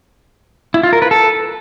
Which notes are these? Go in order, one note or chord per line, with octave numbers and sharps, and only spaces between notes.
E4
F4
A#4
B4
A4